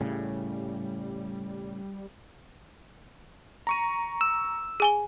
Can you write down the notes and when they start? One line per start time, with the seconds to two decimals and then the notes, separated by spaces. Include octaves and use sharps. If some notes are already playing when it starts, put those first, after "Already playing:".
0.01 A2 C#3 G3
3.67 A#5 C#6 D#7
4.21 E6
4.80 G#4 G#5 G7